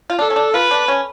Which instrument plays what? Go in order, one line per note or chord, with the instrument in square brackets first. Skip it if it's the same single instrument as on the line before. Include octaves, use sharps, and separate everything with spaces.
[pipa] F4
[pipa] D4 [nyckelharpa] A4
[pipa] C#4
D4
[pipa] F4 [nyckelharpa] B4
[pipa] D4
C#4